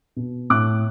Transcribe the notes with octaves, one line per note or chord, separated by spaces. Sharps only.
B2
A2 D6 F#6